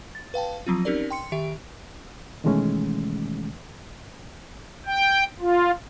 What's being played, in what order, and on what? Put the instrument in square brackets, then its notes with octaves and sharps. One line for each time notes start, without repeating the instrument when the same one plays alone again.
[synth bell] A6
B4 F5 G5 A5
F3 F#3 C4 F4
C4 C#4 D#4 G4 A#4 D5
G5 C6 C#7
D#3 G4 E5 D7
[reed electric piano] B2 D#3 E3 G#3 A3 C#4
[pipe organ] G5
F4